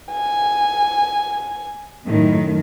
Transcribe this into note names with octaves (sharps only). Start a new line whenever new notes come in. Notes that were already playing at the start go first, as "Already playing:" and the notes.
G#5
F#2 A2 D#3